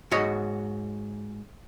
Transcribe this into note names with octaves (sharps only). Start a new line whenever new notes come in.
G#2 F#4 C#5 D#5